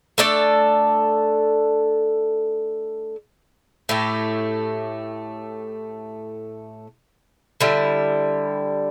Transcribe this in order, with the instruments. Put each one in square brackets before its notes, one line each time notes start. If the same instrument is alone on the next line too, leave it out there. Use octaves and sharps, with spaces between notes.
[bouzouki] A3 D4 A4 D5
A2 A3 G4
D3 G3 E4